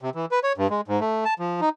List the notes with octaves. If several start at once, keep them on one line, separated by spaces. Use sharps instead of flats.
C3
E3
B4
C#5
G2
G#3
G#2
A3
A5
F3
D#4